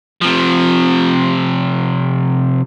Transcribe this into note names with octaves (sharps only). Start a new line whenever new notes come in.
C3 F3